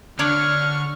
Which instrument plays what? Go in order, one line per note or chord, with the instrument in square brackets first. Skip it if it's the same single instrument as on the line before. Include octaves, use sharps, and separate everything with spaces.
[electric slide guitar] D3 [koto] D4 C#5 D5 [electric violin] C#6 F6